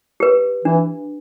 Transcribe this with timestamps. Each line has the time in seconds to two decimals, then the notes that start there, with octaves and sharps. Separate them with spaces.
0.20 G4 B4
0.65 E3 D4